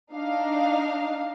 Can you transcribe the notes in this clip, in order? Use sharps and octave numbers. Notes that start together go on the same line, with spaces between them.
D4 D#4 F5